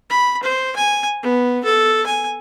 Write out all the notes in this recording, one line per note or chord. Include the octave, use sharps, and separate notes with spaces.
B5
C5
G#5
B3
A4
G#5